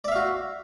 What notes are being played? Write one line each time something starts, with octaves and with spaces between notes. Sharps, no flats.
F#4 D5 E5 F5